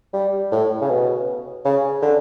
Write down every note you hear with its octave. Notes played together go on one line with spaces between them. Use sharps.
G3
A2
C#3
B2
C#3
D3